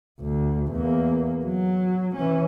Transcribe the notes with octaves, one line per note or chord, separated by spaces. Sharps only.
D2
E2 A#3
F#3
E3 C#4